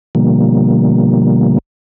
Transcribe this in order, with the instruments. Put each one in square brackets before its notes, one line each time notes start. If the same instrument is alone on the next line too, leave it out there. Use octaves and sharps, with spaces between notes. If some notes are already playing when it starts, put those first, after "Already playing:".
[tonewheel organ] B2 D3 F3 G3 A#3